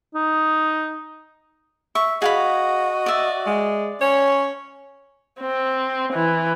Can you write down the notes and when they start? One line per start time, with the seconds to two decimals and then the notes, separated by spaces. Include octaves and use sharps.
0.15 D#4
1.95 E5 C#6
2.22 F#4 G#4 D#5 F5 B5
3.06 D5 E5
3.47 G#3
4.01 C#4 C#5
5.40 C4
6.12 E3